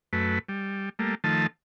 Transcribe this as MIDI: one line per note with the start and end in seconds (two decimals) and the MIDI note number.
0.13 0.39 42
0.13 0.39 57
0.13 0.39 71
0.49 0.89 55
0.99 1.15 55
0.99 1.15 57
0.99 1.15 58
1.24 1.47 51
1.24 1.47 53
1.24 1.47 57
1.24 1.47 81